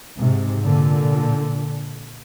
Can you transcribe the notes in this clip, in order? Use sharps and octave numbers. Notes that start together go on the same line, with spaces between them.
G#2 C3
A#2 D3